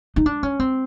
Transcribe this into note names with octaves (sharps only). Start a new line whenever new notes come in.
D#4
D4
C#4
C4